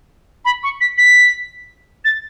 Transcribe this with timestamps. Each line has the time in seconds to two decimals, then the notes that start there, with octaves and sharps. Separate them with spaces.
0.45 B5
0.63 C#6
0.80 B6
0.97 B6
2.04 A6